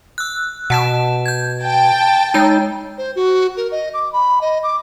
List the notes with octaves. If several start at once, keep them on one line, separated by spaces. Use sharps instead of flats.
E6 F#6
B2 F#5 A5 E7
G6 G#6
G5 A5
G#3 D#4 G6
C5
F#4
A#4
D#5
D6
B5
D#5
D6